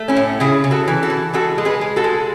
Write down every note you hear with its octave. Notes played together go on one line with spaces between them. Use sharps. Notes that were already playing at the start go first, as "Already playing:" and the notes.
Already playing: A3
C#4 E4
A2
C#3 E4 G#4
C#3
F#4 A4
E3
F#4 A4
E3
G#3 F#4 A4
G#3
G#4 B4
G#3
F#4 A4
G#3